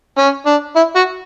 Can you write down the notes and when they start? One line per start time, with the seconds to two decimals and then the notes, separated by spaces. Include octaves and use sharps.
0.18 C#4
0.46 D4
0.76 E4
0.95 F#4